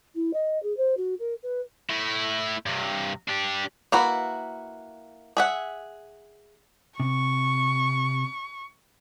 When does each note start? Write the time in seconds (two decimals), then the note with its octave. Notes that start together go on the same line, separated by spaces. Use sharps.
0.15 E4
0.33 D#5
0.62 G#4
0.77 C5
0.97 F#4
1.19 A#4
1.42 B4
1.90 A3 E4
2.66 G2 C3
3.28 D4 G4
3.92 A#3 E4 F#4 B4
5.37 G#4 E5 F#5
7.00 C3 C#6